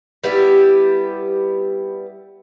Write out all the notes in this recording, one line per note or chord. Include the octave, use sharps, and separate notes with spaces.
G3 B3 E4 G4